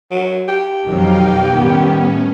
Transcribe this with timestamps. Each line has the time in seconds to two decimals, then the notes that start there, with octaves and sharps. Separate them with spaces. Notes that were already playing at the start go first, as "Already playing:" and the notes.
0.11 F#3
0.48 G4
0.85 F2 B2 D#3 F#3 D#4 F5
1.50 A2 D#3 G3 B3 C#4